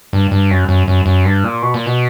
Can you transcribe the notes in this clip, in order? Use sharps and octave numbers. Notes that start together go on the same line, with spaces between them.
G2
G2
F#2
F#2
F#2
F#2
G2
A#2
B2
A#2
B2